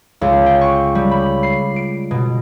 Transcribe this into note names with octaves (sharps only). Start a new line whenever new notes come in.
C#2
G5
C#6
G3
B5
C7
D7
B2